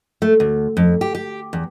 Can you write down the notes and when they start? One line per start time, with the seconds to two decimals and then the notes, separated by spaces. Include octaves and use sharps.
0.22 A3
0.40 D2
0.77 F2
1.01 G4
1.15 G4
1.53 E2